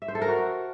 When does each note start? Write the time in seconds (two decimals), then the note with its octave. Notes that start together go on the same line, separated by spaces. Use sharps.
0.02 E5
0.08 C5
0.15 A4
0.22 A#4
0.28 F#4